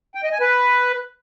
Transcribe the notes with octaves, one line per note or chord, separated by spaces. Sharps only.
G5
D#5
G#5
B4